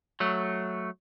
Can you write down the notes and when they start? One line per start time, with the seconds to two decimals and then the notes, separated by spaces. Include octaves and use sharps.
0.20 F#3 A3